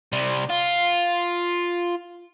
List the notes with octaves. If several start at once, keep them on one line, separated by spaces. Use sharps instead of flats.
C3 G3
F4